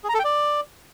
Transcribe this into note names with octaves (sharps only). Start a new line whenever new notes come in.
G#4
A#5
A4
G5
D5